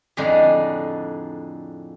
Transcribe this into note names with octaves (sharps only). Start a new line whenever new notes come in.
F2 A2 D3 G#3 D4 D#4